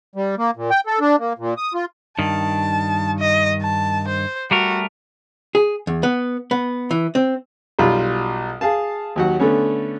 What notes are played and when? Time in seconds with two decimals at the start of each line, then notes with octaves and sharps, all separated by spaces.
0.15 G3
0.38 A#3
0.56 A#2
0.70 G5
0.87 A4
1.00 D4
1.19 A#3
1.38 A#2
1.57 D#6
1.74 F4
2.19 G2 D#3 A5
3.19 D#5
3.62 A5
4.08 C5
4.51 G3 A3 F#4 A#4
5.55 G#4
5.87 E2
6.03 B3
6.51 B3
6.91 E3
7.15 C4
7.79 B1 G3 F4 B5
8.61 G#4 F5 A5
9.16 D#2 F#3 F#5
9.40 D3 A3 B3 C#4